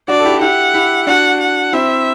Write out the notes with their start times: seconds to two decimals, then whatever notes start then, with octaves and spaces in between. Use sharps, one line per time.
0.08 D4 F#4 D5
0.19 A4
0.25 E4 G4
0.34 F#4
0.41 E4 G4 F#5
0.74 E4 G4
1.07 D4 F#4 F#5
1.41 F#5
1.72 C4 E4 E5